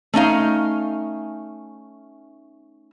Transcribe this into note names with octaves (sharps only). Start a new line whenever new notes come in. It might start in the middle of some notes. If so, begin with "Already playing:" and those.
A3 C#4 D#4 F5